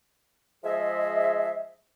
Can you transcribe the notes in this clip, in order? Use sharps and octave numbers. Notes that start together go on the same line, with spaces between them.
F3 G#3 G#4 C5 D#5 E5